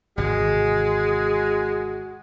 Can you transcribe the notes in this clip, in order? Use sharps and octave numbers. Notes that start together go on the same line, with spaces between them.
G#1 E2 C3 G#3 F#4